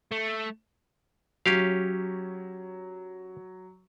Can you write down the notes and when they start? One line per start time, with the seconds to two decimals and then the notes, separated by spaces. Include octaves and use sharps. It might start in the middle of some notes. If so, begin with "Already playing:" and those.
0.11 A3
1.46 F#3 C#4 G4 F5